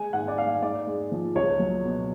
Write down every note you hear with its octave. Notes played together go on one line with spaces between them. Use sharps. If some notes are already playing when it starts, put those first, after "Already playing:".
Already playing: G#3 G#5
G#2 F#5
D5
G#3 F5
G#2 D5
G#3
F3
C#2 C#5
F#3
B2